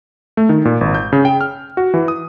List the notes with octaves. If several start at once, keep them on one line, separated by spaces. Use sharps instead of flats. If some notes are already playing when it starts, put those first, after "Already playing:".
A3
D#3
A#2
G#1
G6
C#3
G5
F6
F#4
E3
D#6